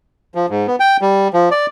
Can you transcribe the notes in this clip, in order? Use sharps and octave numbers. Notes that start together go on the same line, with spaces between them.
F3
G#2
B3
G5
G3
F3
D5